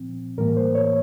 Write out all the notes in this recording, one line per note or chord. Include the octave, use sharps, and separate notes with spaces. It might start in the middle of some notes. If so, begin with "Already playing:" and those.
Already playing: A#2 F3 C4
A2 E3 G3 A#3 A#4
C5
C#5